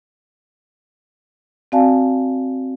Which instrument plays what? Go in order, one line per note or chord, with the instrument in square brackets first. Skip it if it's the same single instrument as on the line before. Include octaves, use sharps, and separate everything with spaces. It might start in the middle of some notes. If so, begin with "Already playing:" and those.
[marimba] C4 F#4 D5 F5 G#5 A5